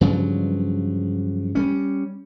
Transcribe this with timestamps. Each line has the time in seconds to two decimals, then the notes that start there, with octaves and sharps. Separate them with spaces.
0.01 G2 C#3 F3 F#3
1.55 G3 A3 C#4